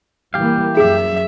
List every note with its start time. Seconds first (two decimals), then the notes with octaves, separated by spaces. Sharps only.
0.34 E3 G3 A#3 G4 F5
0.77 F#2 F#3 G#4 E5